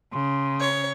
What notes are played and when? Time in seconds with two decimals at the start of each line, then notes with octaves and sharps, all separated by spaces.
0.13 C#3 C6
0.60 C#5